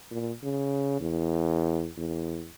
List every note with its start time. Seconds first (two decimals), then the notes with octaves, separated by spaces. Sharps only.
0.11 A#2
0.43 C#3
1.01 E2
1.97 E2